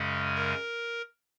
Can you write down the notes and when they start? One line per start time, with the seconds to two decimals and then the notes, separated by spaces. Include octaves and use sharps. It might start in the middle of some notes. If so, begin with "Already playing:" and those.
Already playing: F#2 C#3 G#3 C#4
0.35 A#4